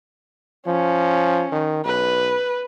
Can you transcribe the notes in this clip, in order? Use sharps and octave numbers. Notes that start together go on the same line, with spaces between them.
F3 C#4
D#3
B1 B4